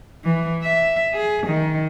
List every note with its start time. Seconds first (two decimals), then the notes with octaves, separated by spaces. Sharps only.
0.24 E3
0.63 E5
1.14 G#4
1.47 D#3